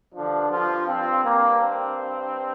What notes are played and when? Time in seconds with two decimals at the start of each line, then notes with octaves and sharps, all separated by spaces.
0.15 G2 D3 F3 D4
0.51 F3 F4
0.87 C4
1.24 A#3
1.59 C4